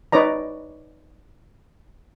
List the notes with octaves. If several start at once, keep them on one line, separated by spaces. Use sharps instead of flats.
D#4 B4 C#5 D5 A#5